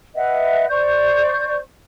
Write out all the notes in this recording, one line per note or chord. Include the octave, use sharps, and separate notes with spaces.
B4 D#5 E5 F#5
C5 D5 C#6 G6